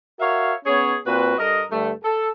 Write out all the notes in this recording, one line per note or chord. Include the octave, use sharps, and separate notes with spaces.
F#4 A#4 C#5 E5 F5
B3 C#4 G#4 C#5
A#2 C4 F#4 B4
G2 A4 A#4 D#5
G2 D3 A3
A4